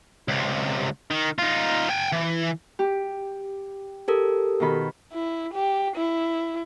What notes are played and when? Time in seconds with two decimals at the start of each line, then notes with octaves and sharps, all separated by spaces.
0.28 C#2 C3
1.11 D#3
1.38 D#4 F4
1.91 G5 G#5
2.13 E3
2.79 G4
4.08 G4 A4 A#4
4.60 B2 D#3 B5
5.13 E4
5.54 G4
5.96 E4